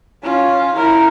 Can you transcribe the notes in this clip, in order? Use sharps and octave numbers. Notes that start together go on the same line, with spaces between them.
C#4 F4
E4 A#4